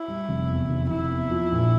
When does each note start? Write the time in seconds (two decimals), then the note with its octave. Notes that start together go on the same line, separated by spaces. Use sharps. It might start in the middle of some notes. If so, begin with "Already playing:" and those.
Already playing: E4
0.08 G3
0.29 F1
0.49 E2
0.69 F1
0.89 F1 E4
1.11 E2
1.31 F3
1.52 A#1